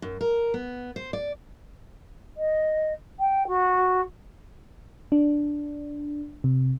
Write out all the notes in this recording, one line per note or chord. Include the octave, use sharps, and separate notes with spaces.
F#2
A#4
B3
C5
D5
D#5
G5
F#4
D4
C3